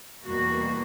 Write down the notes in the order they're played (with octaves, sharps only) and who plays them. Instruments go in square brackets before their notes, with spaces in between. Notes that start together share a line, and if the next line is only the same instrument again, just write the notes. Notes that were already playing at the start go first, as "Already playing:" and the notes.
[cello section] E2 B2 G3 A#3 F#4